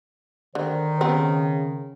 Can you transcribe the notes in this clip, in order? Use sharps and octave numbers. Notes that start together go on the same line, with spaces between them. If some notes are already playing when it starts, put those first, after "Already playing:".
D3 D#3 C5
C#3 B3 C4